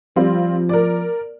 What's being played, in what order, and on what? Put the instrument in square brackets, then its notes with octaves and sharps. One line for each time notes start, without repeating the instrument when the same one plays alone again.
[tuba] F3 [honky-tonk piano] G3 C4 F4
[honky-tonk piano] A#4 D5